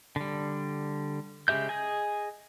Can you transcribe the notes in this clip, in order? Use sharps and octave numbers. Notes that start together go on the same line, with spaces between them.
D3 G3
C#3 G#3 G4 E5 G6
G#4 D#5 G#5